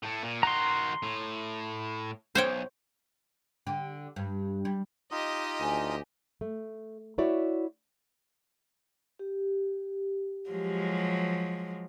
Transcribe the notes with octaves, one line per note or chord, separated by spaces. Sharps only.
A2 A3
A#2
D#3 F#4 A#5 C6
A2
B1 C5 C#5 G5
D3 G4
G2
G3
D#4 F4 G4 D#5 D#6
D2 G#5
A3
E4 F#4 C#5 D5 E5
G4
F3 F#3 G#3